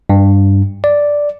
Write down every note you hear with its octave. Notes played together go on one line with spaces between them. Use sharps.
G2
D5